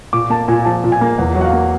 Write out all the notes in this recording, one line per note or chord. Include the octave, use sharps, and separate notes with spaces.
A#2 D6
A#3 A5
A#2 G#5
F3 A5
A#2
G#5
A#3
E2 F#5
F#3
F#5
F5
A#3